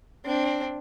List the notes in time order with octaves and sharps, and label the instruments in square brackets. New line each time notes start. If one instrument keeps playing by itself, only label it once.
[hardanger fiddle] C4 D4